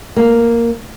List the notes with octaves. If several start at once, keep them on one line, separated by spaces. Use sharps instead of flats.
A#3